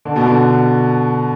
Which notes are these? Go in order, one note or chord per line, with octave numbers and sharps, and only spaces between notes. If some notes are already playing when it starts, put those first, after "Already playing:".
D3
B2
D3